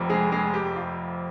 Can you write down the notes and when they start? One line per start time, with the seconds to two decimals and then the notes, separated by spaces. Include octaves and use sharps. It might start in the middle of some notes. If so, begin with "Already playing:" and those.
Already playing: F1 F2 C3
0.10 G#3 G#4
0.32 G#3 G#4
0.54 G4
0.76 F4